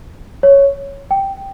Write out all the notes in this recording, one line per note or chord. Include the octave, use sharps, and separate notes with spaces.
C#5
G5